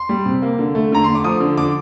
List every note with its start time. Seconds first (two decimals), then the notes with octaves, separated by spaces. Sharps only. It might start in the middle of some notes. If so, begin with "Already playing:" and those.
Already playing: C6
0.09 G3
0.26 C3
0.42 A#3
0.59 D3
0.75 A3
0.92 D3 A#5
1.04 A3 C6
1.15 D6
1.24 F3 D#6
1.40 D3
1.57 D3 D6